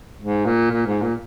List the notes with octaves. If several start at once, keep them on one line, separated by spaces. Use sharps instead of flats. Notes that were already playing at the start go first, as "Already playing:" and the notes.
G#2
A#2
A#2
G#2
A#2